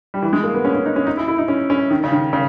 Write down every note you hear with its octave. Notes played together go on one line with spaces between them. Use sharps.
G3
E3
G#3
A#3
B3
C#4
C#4
D#4
C#4
D#4
E4
E4
D#4
C#4
C#4
D#3
C#3
D#3
C#3